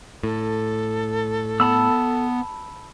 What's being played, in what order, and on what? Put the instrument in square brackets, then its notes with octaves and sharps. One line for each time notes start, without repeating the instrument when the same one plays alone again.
[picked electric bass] A2 [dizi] A4
[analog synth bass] B3 [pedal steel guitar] A5 B5 E6